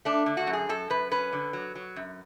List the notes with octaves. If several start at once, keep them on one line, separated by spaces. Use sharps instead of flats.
A3 D4
D3
F#4
F#2
G#4
F#2 A4
F#2 B4
C#4 B4
D3
F#3
F#3
F#2